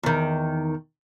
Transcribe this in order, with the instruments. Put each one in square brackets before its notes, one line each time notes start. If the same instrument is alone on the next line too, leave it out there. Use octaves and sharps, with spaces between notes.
[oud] E2 D#3